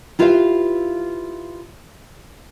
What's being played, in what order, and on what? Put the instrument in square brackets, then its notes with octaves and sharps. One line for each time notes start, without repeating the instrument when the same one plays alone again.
[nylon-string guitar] E4 F4 G4 B4 E5 F5